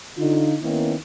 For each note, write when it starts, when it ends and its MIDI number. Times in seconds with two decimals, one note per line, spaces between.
0.17 0.55 50
0.17 0.55 63
0.17 0.55 65
0.61 0.94 51
0.61 0.94 58
0.61 0.94 59
0.61 0.94 61
0.61 0.94 63
0.61 0.94 64